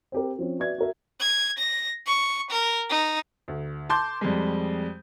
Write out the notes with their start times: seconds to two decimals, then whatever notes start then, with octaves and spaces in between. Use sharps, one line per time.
0.12 C4 G4 A#4
0.39 F3 C4 C#4
0.59 F#4 B4 D5 E5 G#6
0.78 F#4 A#4 E5
1.20 G#6
1.58 A#6
2.07 C#6
2.51 A#4
2.90 D#4
3.48 D2
3.89 A5 C6 D6 G6
4.21 F2 G3 G#3